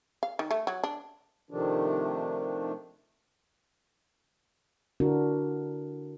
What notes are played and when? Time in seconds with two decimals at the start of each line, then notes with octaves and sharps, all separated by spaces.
0.23 F5
0.39 D#3
0.51 A3
0.67 F#3
0.84 D4
1.50 C3 D#3 F3 A3 D4
5.00 D3 D4 E4 F#4 A#4